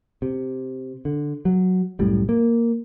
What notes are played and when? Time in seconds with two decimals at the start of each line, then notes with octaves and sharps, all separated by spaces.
0.22 C3
1.05 D3
1.45 F#3
1.99 C2 F#2 A2 G3
2.29 A#3